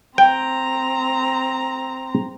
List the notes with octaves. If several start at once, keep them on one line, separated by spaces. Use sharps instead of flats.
C4 G5 A#5